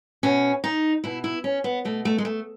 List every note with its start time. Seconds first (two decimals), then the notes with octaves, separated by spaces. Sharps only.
0.23 B2 C#4
0.64 D#4
1.04 B2 E4
1.24 E4
1.44 C#4
1.64 B3
1.85 B2 A3
2.05 A3
2.18 G#3
2.25 A3